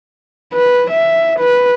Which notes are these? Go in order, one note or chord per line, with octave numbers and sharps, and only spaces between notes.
B4
E5
B4